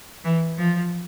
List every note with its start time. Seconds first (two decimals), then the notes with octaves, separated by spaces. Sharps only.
0.24 E3
0.58 F3